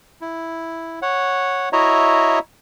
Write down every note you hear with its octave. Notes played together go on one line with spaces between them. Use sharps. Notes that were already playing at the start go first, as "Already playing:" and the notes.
E4
C#5 F#5
E4 F#4 C#5 D#5 E5 A#5